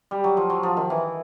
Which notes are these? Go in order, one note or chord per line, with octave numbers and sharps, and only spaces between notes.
G3
F#3
F3
F#3
F3
D#3
E3